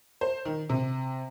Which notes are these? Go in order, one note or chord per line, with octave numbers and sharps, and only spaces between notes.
C5
D#3
C3